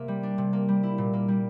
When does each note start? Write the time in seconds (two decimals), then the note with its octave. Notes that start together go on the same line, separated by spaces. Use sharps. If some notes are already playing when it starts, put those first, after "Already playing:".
Already playing: C3 A#3 E5
0.08 G3
0.23 D4
0.38 C3
0.53 A#3
0.68 G3
0.83 E4
0.98 A#2
1.13 A#3
1.28 G3